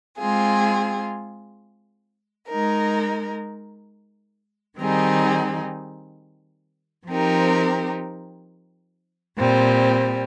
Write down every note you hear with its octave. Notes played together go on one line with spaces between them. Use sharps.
G#3 C4 F4 G#4
G#3 D#4 A#4
D#3 G3 C4 D#4 G#4
F3 C4 D#4 G4 A#4
A#2 G3 C4